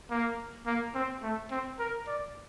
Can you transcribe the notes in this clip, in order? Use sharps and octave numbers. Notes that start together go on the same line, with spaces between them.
A#3
A#3
C4
A3
C4
A#4
D5